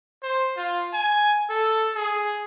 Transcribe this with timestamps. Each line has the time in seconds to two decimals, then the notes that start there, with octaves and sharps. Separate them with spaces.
0.23 C5
0.57 F4
0.94 G#5
1.50 A4
1.95 G#4